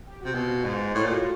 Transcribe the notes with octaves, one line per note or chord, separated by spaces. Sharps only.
G4
C3 F#4
B2 F4
G#2
A2 F4
A#2 F#4
A2
F4